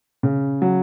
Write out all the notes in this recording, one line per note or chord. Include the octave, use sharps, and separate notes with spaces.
C#3
F#3